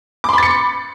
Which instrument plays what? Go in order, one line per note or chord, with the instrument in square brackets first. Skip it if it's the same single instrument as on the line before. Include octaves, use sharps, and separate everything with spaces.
[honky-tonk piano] D6
C6
B5
A6
C#7